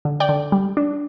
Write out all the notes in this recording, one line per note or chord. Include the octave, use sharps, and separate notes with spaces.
D3
D5 G5
D3
G3
D4